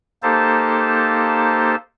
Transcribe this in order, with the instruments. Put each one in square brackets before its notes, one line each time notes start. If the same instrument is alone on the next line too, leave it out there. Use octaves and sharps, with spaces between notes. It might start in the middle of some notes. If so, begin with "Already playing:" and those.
[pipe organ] A#3 D#4 G4 A4 C5 A5